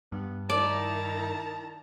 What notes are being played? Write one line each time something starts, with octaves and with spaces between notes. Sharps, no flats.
G2 B3
D#3 E4 D5 A5 A#5